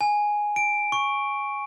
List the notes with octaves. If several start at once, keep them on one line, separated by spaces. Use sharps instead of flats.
G#5
D7
C#6